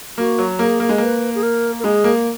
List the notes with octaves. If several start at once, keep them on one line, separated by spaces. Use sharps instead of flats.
A#3 F#4
F#3
A#3 G#4
A#3
G#3
A#3 B4
G#4
A#4
A#4
G#3 G#4
A#3